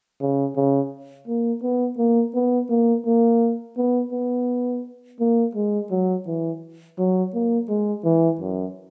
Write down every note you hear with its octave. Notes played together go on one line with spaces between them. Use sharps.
C#3
C#3
A#3
B3
A#3
B3
A#3
A#3
B3
B3
A#3
G#3
F#3
E3
F#3
A#3
G#3
E3
F#2